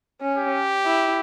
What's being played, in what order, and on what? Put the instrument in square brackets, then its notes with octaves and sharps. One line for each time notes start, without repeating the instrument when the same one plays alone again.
[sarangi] C#4
[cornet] G4
[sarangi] E4